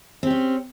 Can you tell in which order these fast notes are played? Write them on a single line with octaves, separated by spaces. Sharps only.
C4 G4 C#4